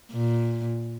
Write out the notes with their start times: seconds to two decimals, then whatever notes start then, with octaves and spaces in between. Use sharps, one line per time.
0.12 A#2